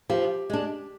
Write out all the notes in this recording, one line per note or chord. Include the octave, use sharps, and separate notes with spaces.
F3 G4
G#3 D4